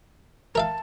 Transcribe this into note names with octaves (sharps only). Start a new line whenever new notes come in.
A#4 E5 F5 A5